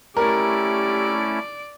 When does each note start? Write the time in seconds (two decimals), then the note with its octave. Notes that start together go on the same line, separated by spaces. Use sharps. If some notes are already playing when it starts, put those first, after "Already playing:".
0.17 A3 C#4 E4 G4 A#4 D5 D7